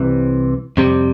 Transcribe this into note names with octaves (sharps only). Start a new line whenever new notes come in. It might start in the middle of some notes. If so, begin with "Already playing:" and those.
Already playing: C2 C3 E3
F2 C3 G3